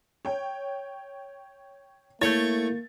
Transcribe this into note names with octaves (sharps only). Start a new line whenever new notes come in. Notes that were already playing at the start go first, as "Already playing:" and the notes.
C#5 G5
A3 A#3 E4 C#5 G6 A6